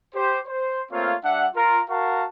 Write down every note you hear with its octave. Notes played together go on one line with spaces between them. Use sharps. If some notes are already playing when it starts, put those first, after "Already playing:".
G4 C5
C5
A3 A#3 C4 F4 C#5 F5
G3 D4 E5 F#5
F4 A#4
F#4 A#4 F5 F#5 A5 C#6